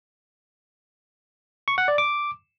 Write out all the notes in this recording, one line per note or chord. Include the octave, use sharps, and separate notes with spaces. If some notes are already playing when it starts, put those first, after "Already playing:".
C#6
F#5
D5
D6